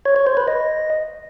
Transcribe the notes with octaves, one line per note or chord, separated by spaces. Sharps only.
C#5
C#5
C5
B4
D#5